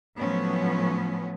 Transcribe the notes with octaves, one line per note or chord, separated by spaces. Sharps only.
A2 F3 F#3 B3 C#4